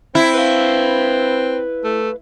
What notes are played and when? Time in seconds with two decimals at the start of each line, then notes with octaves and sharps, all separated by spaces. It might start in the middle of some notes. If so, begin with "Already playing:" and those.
0.15 C4 E4
0.34 B4 F5
1.84 A3